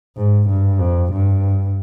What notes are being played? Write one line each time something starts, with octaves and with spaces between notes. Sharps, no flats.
G#2
G2
F2
G2